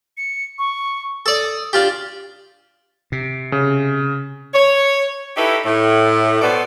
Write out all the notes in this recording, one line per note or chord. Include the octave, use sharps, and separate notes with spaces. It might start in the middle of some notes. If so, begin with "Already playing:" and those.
C#7
C#6
A4 D5 D#6
D4 F4 G4 A6
C3
C#3
C#5
D#4 E4 G4 A4 B4 C#5
A2
B2 B3 A4 C5 D5